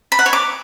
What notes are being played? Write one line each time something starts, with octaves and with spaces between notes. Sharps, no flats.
B5
F#5
C#5
D6